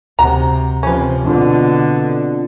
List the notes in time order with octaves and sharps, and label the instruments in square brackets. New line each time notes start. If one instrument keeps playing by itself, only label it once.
[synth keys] D2 [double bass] C3 [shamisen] F#4 A#5
[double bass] C3 F3 [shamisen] C#4 B4
[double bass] B2 D3 [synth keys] C4 D4 F4